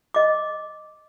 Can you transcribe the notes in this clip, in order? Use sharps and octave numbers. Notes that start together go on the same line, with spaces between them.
D#5 D6